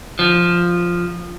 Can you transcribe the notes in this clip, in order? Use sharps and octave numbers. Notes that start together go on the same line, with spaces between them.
F3